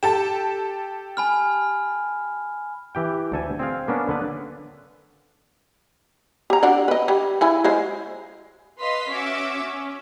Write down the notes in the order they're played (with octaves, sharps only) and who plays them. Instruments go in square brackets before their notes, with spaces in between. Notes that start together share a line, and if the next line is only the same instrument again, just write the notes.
[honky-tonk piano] G4 A4 A5 [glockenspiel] E7
[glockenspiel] G#5 B5 F6
[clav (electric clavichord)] E3 G4 G5
D2 A4 G#5
C4 G#4 F5
A#3 B3 C#4 D4
D3 B3 B4
[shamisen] G4 A#5
D4 F#4 D5
B4 D#5
G3
C#3 E4 G#5
G#3 C5 F5
[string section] B4 D#5 F5 C6 B6
C#4 F#4 E5 D6
C#4